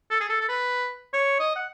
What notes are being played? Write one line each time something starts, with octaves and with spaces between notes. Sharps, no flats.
A4
G#4
A4
A4
B4
C#5
D#5
F#5